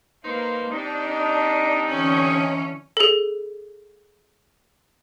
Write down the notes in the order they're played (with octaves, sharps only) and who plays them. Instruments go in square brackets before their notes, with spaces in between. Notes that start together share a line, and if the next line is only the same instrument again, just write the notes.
[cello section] A#3 [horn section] D#4 B4 C5
[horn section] G3 C4 D#4 [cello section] D4
[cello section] D3 E3 C#4
[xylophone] G#4 A4